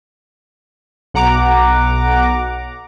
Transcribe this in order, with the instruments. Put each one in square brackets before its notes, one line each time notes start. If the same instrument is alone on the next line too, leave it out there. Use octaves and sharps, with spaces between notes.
[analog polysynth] B1 F#5 A#5 D6